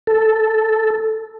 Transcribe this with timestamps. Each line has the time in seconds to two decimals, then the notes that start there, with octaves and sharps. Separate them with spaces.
0.07 A4